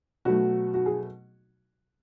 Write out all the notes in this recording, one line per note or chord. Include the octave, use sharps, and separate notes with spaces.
B2 F#3 A3 F#4
F#4
G#4